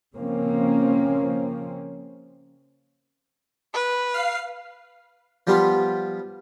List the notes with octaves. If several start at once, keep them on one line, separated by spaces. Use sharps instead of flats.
C#3 F3 A#3 C4 C#4
B4
F5 C7
F3 G3 B3 F4